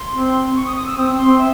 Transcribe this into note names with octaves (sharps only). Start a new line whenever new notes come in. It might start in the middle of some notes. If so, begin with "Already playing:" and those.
Already playing: C6
C4
C#6
D#6
D#6
E6
C4 D#6
C6
C4
E5